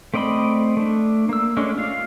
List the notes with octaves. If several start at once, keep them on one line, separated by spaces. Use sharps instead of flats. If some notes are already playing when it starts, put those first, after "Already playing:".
A3 C4 D5 D#5 B5
A3 D4
A#3 E6
G#3 A3 C#4 D4
F4 F5